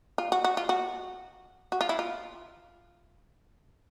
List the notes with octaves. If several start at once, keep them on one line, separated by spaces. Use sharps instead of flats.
F4
F#4
F#4
F4
F#4
F#4
F4
E4
F4